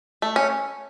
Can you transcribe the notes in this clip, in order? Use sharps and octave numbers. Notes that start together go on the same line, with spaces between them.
A3
C#4